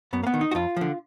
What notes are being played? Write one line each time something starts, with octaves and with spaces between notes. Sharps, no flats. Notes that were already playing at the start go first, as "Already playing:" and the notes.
F#2 B3
A#3
B3
D#3
D#4
F#4
F2 F4
D3 F3